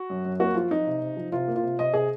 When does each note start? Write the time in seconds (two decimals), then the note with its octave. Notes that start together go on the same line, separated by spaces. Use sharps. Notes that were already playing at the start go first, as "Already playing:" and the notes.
Already playing: F#4
0.10 F#2
0.25 F#2
0.40 A#3 F#4
0.55 F3 F4
0.71 F3 D#4
0.86 C3
1.01 C3
1.17 F3
1.32 C3 F4
1.48 A#3
1.55 F4
1.63 C3
1.78 C3 D#5
1.94 C3 G#4